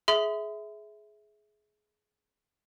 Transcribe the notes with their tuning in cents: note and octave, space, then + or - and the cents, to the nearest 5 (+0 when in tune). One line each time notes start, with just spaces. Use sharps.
G#4 +20 E5 -10 C6 -45